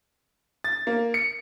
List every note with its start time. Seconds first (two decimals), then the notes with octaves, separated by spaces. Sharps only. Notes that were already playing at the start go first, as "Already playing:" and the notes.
0.64 A6
0.87 A#3
1.14 C#7